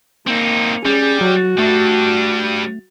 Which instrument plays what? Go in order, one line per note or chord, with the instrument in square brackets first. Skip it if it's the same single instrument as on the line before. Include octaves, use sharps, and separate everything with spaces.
[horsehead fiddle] A#3 [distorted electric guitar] C4 D#4
[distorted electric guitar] G3 [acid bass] C#4 [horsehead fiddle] G#4
[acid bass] F#3 [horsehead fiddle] F#4
[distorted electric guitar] G3 D4 [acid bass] A3